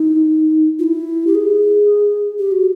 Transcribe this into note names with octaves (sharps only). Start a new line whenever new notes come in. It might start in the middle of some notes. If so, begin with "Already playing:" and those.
Already playing: D#4
F4
E4
G4
G#4
G4
F#4